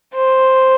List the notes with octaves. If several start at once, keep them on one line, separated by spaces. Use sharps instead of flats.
C5